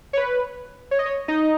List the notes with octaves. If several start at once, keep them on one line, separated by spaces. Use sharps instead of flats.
C#5
B4
C#5
D#5
C#5
D#4 D#5